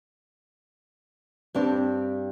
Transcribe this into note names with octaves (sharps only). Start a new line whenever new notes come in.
G2 C4 D4